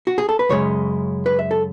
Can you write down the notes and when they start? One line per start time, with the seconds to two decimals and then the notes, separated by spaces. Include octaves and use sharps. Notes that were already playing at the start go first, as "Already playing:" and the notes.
0.07 F#4
0.18 G#4
0.29 A4
0.39 B4
0.49 F#2 C#3 G#3 C#5
1.26 B4
1.39 E5
1.51 A4